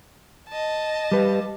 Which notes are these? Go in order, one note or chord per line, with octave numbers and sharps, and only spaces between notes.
D#5 A5
G3 B4